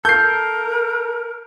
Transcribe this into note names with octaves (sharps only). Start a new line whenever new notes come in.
A4 A#4 G6 C7